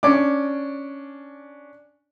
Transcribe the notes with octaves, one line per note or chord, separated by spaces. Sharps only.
C#4 D4 D6